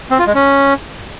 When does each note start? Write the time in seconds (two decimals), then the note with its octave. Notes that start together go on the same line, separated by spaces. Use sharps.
0.11 C4
0.19 F4
0.27 G#3
0.35 C#4